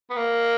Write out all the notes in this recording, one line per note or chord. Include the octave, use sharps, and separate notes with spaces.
B3
A#3